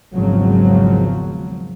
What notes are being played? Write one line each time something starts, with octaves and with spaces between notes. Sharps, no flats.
G#1 E2 C#3 F3 F#3